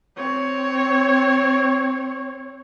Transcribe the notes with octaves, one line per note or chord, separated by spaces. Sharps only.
C4 C#5